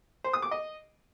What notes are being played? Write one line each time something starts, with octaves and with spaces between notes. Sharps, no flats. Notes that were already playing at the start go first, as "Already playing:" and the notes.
C5
D#6
D6
D#5